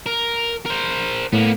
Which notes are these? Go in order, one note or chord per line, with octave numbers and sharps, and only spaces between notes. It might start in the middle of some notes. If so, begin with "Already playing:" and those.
A#4
A#4 C5
A2 A#3 B3